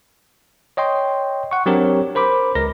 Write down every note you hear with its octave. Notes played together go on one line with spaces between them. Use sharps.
C#5 D#5 G5 C6
F#5 C#6
F#3 C4 D4 G4 A#4 C#5
A#4 C5 B5 D6
C#2 A#4 A#6